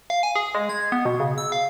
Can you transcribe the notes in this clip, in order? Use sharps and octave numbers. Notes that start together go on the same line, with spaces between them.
F5
G#5
G#4
G#3
G#6
B3
B2
C#3
E6
F5